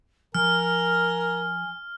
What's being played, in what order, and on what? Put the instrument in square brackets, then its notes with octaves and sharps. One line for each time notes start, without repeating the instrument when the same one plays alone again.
[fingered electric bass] F3 [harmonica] A#4 [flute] G#5 [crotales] F6